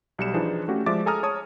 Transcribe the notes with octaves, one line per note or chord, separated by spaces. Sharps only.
B1 G3 C#7 E7
E3 F3 D4 D#4 G#4 C5
A3 C#4 F#4 G4
F3 G#3 D5 E5 D6 A6
G#4 A4 G#5 A#5 D#6 F6
C#5 A5 D#6